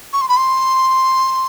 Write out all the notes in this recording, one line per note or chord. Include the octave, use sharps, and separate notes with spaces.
C#6
C6
B5
C6